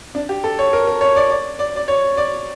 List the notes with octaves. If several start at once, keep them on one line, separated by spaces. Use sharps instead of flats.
D4
G4
A4
C#5
A#4
A#4
C#5
D5
D5
D5
D5
C#5
D5